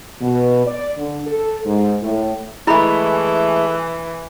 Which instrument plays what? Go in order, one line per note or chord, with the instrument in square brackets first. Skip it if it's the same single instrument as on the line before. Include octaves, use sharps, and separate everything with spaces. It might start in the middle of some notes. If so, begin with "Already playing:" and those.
[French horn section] B2
D5
D3
A4
G#2
A2
[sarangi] E3 [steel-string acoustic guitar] G#3 A3 [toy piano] E4 B5